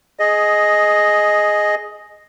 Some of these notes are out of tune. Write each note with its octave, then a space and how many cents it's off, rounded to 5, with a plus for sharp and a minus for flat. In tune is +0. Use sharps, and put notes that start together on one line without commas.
G#4 +10 D#5 +0